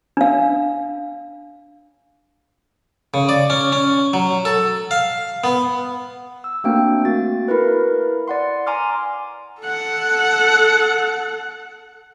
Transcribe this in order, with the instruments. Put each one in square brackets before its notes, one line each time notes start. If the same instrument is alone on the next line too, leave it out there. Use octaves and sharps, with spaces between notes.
[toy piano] D4 F5
[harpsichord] C#3
D5
C#4
C#4
F#3
A4
F5
B3
[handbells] E6
A3 A#3 C4 D4 F#4 G5
A#3 F#4 A6
E4 A#4 B4
D5 F#5 C6
G#5 A#5 C6 D6 F6
[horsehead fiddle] A4 F#5